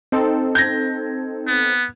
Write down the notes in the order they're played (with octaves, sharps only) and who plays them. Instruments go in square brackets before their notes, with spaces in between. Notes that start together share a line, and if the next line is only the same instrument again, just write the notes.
[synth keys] C4 D#4 A4
[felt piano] G6 G#6 A#6
[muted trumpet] B3